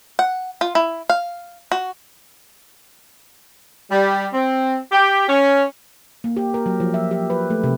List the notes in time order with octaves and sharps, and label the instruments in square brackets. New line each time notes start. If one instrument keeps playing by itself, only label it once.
[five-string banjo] F#5
F4
E4
F5
F#4
[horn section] G3
C4
G4
C#4
[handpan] A#3
G4
A#4
F#3
F3
E5
G4
B4
A3
C3